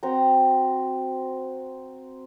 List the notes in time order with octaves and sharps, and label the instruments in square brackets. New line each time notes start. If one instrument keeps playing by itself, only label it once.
[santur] C4 F#4 A#5